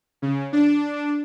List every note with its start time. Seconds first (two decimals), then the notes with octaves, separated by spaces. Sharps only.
0.22 C#3
0.53 D4